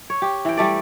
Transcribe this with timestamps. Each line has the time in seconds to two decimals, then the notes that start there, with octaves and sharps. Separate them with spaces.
0.10 C#5
0.22 G4
0.45 E3 G5
0.57 G3 A3 D5